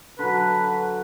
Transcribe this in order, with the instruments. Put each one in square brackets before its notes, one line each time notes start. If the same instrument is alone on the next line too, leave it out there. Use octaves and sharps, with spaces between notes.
[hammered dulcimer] D3 F#3 [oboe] B4